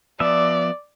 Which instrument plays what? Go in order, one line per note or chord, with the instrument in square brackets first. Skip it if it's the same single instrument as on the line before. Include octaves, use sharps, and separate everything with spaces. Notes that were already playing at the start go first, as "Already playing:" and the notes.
[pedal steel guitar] F3 B3 E5 [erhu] D5